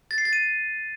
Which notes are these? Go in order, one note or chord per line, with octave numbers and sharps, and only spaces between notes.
A6
C7
A6
D#7